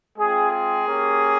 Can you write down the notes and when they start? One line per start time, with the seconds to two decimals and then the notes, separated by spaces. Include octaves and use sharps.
0.17 G#3 C4 F4 G#4
0.52 G#4
0.87 A#3 C#4 G4